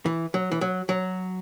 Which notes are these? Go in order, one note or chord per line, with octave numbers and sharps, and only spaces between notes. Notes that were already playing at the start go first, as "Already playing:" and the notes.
E3
F#3
E3
F#3
F#3